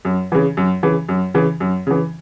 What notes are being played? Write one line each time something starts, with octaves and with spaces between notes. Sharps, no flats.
F#2
C#3 E3
F#2
C#3 E3
F#2
C#3 E3
F#2
C#3 E3